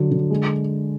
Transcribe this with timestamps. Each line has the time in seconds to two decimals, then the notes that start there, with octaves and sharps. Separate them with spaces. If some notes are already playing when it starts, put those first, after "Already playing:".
Already playing: D3 F#3
0.11 D3
0.30 G#3